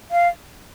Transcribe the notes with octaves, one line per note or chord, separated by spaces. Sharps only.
F5